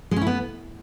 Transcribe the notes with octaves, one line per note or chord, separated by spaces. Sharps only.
G#3
C#4
E4
B3